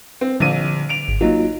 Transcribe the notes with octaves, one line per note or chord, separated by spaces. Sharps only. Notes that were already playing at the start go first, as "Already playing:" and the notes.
C4
A#1 D3 D#7
D7 F7
G#1
F#3 A#3 D#4 F4